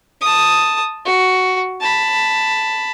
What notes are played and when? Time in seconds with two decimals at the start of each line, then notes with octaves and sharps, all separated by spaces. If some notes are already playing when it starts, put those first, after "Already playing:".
0.21 A5 D#6
1.05 F#4
1.80 A5 B5